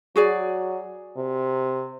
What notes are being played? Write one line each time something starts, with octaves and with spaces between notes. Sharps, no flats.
F#3 F#4 G#4 D5
C3